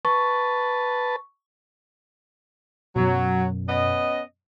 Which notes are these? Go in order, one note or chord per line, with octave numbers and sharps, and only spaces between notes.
B4 A5 C#6
F#2 B2 F#3
B3 C#4 D#5